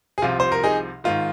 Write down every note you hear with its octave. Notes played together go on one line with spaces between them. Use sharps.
G#4
C2 C3 F3 F4
C5
A#4
D#4 G#4
G#2 D#3 F4